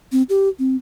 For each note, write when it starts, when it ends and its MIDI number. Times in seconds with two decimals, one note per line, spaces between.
0.12 0.23 60
0.29 0.49 67
0.59 0.76 60